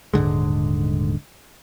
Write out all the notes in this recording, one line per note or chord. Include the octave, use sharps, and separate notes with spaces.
D#1 G#2 D3 G#3